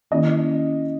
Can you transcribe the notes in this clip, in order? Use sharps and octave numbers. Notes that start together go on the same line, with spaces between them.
D#3 A#3 C#4 E4 D#5